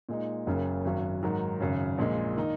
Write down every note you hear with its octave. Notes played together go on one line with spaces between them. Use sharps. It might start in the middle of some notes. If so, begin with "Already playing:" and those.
A#2 G#3 D#4
F#1 F#2 C#3 A#3
G#1 F#2 F#3
G#2 D#3 F#3
G#1 F#2 C#3
A#1 A#2 G#3
D#3 A#3 D#4